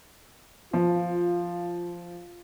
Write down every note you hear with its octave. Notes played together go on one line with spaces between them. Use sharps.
F3 F4